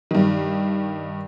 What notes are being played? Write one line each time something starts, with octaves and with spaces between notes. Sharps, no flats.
G2 D#3